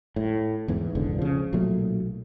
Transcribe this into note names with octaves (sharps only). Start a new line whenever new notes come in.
A2
E2 G#2 E3
E1 C#2 G#2 D3
C#3 F3
B1 A#2 F#3 A3